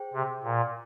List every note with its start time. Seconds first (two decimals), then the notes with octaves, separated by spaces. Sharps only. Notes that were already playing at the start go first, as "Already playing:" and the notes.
Already playing: G#4 C5 G5
0.14 C3
0.43 A#2